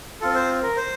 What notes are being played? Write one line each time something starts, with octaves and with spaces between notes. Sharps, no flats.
C4 F4 A4
C5
A#4
C5